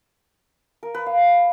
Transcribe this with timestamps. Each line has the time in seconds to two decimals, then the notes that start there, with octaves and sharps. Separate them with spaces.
0.83 A#4
0.94 B4
1.06 F5